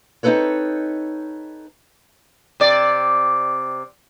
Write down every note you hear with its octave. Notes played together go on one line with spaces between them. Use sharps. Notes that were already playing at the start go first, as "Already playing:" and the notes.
C4 D#4 F4 A4 B4 C#5
C3 D5